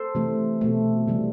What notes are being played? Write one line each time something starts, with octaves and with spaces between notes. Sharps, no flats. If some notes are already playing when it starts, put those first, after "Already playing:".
Already playing: A4 C5
C3 E3 A3
B2 A3
C3 E3 G3